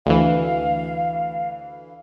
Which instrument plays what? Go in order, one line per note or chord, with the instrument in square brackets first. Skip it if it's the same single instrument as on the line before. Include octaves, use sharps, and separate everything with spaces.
[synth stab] D2 E3 [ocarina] F5